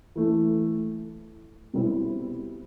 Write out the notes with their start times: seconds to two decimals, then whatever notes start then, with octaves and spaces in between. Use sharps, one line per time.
0.16 E3 A3 E4
1.73 B2 G3 C4 E4